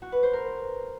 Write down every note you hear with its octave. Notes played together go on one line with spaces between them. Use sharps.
F#4
B4
C5
A#4